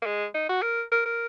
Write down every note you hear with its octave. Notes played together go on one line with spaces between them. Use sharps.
A#3
G#3
D#4
F#4
A#4
A#4
A#4